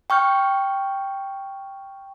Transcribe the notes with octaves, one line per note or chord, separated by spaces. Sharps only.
G5 C#6 F6 G6